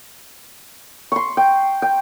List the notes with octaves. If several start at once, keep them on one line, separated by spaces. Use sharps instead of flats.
C6 C#6
G5
G5